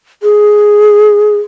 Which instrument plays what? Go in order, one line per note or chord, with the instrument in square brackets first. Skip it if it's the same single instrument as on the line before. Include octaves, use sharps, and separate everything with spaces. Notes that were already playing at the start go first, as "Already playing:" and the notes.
[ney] G#4